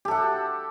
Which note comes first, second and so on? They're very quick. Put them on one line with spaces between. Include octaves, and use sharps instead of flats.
G4 A4 F#5